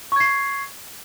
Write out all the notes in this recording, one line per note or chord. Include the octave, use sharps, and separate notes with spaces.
C#6 G#6 C7